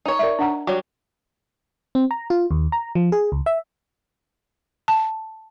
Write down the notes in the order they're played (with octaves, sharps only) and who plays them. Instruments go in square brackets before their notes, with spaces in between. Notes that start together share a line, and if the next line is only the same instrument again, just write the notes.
[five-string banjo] D#4 C#5
[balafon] A#4 D5 E5
D4 F#5 A#5
[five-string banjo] F#3 G3 [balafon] F#4 C#5
[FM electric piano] C4
A#5
F4
D#2
A#5
F3
G#4
C#2
E5
[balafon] A5